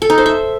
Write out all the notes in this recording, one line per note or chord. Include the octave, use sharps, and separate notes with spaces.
A4
D#4
C5
E5